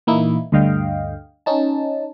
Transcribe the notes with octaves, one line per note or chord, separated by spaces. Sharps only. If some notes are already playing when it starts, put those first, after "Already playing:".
A#2 E3 A#3 D#4 E4
D2 G2 D3 D#5 F5 G5
C#4 D#4 A5